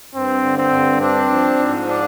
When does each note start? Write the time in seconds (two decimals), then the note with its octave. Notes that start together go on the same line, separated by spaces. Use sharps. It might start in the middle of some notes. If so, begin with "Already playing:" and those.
0.14 G2 C4
0.43 D3
0.58 C4
0.72 G2
1.01 C4 D4
1.30 F3
1.59 G#2
1.87 D4